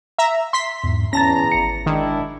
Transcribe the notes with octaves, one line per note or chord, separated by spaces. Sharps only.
E5 A#5
C6 B6
E2 G#2
E2 C#4 A5 A#5 A6 A#6
G#1 C#7
D#3 G#3 D4 E4